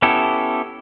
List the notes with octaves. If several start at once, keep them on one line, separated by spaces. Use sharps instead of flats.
B3 C#4 E4 G4 A4